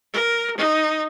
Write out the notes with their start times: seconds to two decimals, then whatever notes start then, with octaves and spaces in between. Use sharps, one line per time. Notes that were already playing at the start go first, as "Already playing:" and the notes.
0.13 A#4
0.57 D#4